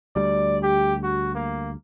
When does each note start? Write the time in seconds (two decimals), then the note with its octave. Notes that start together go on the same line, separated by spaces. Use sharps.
0.16 D2 G3 D5
0.63 G4
1.03 F#4
1.35 A#3